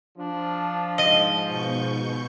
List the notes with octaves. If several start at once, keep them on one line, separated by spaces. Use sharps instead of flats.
F3 D4
G#2 D#5
B2 C#6 G6